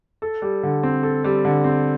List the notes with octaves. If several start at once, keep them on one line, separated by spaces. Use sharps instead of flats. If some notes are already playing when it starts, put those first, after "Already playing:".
A4
G3
D3
C4
A4
G3
D3
C4